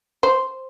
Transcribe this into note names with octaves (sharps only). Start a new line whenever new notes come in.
C5